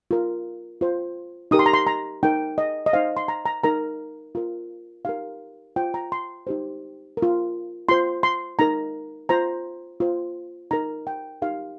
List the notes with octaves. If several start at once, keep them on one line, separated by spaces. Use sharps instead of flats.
F4 A#4
F4 C5
D#4 G4 A#4 D#6
C6
A#5
C6
A#5
D#4 A#4 G5
D#5
D#5
D#4 C5 F5
C6
A#5
A#5
D#4 A#4 A#5
F4 A#4
D#4 G4 A#4 F5
F4 C5 G5
A#5
C6
D#4 G4 C5
A#4
F4
F4 C5 C6
C6
D#4 A#4 A#5
F4 C5 A#5
F4 C5
D#4 A#4 A#5
G5
D#4 G4 A#4 F5